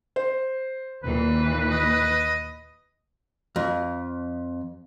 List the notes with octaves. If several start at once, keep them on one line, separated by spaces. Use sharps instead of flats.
C5
D#2 A#2 E3 B4
D#5
F2